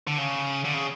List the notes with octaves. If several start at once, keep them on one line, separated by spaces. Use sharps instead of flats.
D3
C#3
D3
C#3